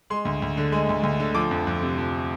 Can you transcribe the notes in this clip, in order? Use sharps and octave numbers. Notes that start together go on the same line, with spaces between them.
G#3 C6
D2
D2
D3
G#3
D2
D2
D3
F3 D6
F2
F2
C3
F3